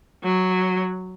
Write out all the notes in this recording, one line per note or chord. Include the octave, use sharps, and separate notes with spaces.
F#3